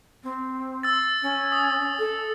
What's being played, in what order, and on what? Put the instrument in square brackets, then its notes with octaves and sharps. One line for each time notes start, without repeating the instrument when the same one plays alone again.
[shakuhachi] C4
[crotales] E6 A6
[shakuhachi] C#4
[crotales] D#6
[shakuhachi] A4